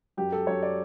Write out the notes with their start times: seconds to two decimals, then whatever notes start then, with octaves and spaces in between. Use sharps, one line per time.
0.17 F#2 G4
0.32 A4
0.47 F#2 C#5
0.63 D5